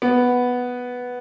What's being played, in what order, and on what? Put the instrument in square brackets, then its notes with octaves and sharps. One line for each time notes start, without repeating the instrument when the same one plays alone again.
[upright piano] B3